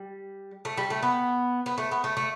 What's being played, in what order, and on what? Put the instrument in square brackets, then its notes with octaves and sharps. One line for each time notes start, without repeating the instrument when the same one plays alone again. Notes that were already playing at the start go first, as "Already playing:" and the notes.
Already playing: [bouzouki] G3
A3
G3
A3
B3
B3
A3
B3
A3
A3